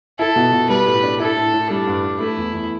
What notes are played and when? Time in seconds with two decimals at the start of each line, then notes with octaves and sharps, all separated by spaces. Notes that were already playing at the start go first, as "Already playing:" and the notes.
0.19 E4 A4
0.36 B2
0.52 B2
0.69 G3 B4
0.87 A2
1.03 D4
1.20 E4 A4
1.37 A2
1.54 A2
1.70 G3 D4
1.87 G2
2.04 G2
2.20 A3 E4
2.37 E2
2.54 E2